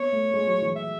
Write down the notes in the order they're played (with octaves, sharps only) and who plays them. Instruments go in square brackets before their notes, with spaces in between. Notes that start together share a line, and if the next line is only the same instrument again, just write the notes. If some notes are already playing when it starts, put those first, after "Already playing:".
Already playing: [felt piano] B3 [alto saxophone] C#5
[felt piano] A3
G#3
F#3
E3
[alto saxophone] E5